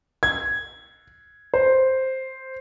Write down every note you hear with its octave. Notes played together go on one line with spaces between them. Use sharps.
G#6
C5